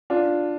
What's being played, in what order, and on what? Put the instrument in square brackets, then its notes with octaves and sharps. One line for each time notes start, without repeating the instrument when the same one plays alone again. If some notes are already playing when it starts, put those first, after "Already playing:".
[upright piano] D4 F4